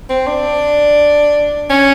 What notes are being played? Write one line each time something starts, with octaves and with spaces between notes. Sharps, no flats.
C4
D4
C#4